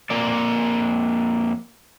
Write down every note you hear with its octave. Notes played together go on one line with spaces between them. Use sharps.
F2 A#3 D5